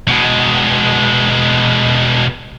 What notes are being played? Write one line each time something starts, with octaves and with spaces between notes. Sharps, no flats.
B2 G#3